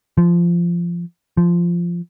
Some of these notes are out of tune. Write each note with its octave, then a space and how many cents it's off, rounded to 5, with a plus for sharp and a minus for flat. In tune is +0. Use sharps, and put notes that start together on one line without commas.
F3 -15
F3 -10